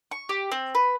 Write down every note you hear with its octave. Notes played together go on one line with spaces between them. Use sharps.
C#6
G4
C4
B4